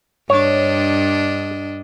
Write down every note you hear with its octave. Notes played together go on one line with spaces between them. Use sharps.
G2 D4 C#5 D#5